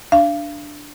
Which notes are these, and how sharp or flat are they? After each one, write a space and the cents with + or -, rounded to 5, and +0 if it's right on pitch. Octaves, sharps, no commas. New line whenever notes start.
D4 +0 F5 -35